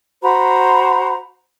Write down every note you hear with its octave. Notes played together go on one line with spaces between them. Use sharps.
F#4 C5 A#5 B5